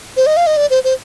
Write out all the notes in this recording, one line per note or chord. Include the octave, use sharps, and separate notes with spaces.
C5
D#5
F5
D#5
D5
C5
C5